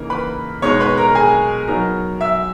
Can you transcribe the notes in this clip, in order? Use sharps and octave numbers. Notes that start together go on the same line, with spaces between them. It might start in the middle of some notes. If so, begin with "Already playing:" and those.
Already playing: C#3 E3 A#3 D#4 A#4
B4 B5
B2 G#3 D#4 C#5 C#6
B4 B5
A#4 A#5
G#4 G#5
F#3 B3 D#4 A#4 A#5
E5 E6